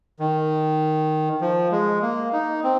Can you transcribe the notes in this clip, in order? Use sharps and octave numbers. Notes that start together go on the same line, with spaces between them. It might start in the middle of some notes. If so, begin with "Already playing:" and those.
D#3
F3
G#3
A#3
D#4
C4